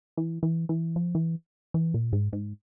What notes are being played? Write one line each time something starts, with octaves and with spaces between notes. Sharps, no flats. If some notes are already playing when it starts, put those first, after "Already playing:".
E3
E3
E3
F3
E3
E3
A#2
G#2
G#2